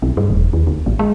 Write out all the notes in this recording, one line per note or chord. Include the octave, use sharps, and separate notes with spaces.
B1
G2
E1
D#2
D2
A1
G#3